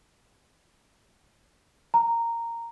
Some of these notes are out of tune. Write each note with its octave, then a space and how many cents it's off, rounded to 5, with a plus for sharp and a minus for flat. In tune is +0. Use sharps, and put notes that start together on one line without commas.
A#5 -10